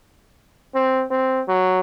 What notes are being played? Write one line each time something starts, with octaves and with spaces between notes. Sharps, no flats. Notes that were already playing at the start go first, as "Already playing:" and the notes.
C4
C4
F#3